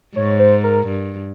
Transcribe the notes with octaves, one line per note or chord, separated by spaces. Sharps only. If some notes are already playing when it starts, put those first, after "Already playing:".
G#2 C#5
C5
A#4
G2